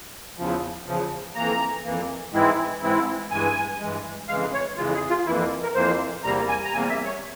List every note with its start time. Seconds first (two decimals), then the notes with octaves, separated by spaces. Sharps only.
0.38 E2 C#3 F3
0.86 E2 C#3 F3
1.35 F2 E3 A#3 A#5
1.84 F2 E3 A#3
2.33 G#2 E3 G#3 C4 E4
2.82 G#2 E3 G#3 C4 E4
3.31 G2 E3 G#3 G#5
3.80 G2 E3 G#3
4.28 F2 C#3 E3 G#3 F5
4.53 C#5
4.77 F2 C#3 E3 G#3 F4
4.94 G#4
5.10 F4
5.26 F2 E3 A#3 E4
5.63 A#4
5.75 F2 E3 A#3 C5
6.24 E2 C3 G3 A#3 A#5
6.49 G#5
6.64 A#5
6.73 E2 C3 G3 A#3 G#5
6.89 E5
7.05 C#5